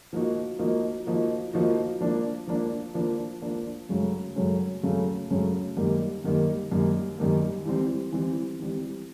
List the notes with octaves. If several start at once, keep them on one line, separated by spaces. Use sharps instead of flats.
F3 A#3 D#4 F#4
F3 A#3 D#4 F#4
F3 A#3 D#4 F#4
F3 A#3 D#4 F#4
F3 A#3 D4
F3 A#3 D4
F3 A#3 D4
F3 A#3 D4
F#2 C#3 F#3 A3 C#4
F#2 C#3 F#3 A3 C#4
F#2 C#3 F#3 A3 C#4
F#2 C#3 F#3 A3 C#4
F#2 D#3 G3 A#3
F#2 D#3 G3 A#3
F#2 D#3 G3 A#3
F#2 D#3 G3 A#3
E3 G3 C4
E3 G3 C4
E3 G3 C4